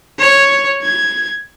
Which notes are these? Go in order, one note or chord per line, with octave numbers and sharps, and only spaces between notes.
C#5
G#6